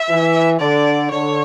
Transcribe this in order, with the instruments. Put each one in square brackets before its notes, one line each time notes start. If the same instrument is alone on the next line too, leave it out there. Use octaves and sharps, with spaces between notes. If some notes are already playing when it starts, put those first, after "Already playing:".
Already playing: [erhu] E5
[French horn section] E3
[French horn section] D3 [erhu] D5
[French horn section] D3 [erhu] C#5